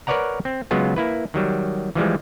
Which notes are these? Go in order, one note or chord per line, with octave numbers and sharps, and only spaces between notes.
A#4 B4 C#5 D5 F#5 A#5
C4
C#3 F#3 G#3 B3 F4
A#3 E4 B4
D#3 F#3 G3
E3 F3 G3 G#3